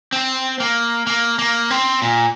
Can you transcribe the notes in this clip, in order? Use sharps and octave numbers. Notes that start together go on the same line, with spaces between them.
C4
A#3
A#3
A#3
C4
A#2